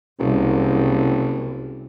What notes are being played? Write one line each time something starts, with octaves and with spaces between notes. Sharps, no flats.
F#1 C2